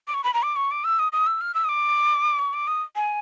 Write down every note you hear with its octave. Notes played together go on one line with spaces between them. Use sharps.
D6
C#6
B5
A#5
D6
C#6
D6
E6
D#6
D#6
E6
F6
E6
D#6
D6
C#6
D6
D#6
G#5